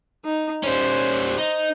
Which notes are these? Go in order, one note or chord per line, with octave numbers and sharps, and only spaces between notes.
D#4
G3 C#4 C5
D#4